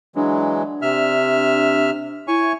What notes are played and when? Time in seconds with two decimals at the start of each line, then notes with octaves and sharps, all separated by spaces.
0.16 E3 F#3 G#3 D4
0.82 C3 E5 F6
2.28 E4 C#5 G#5 C#6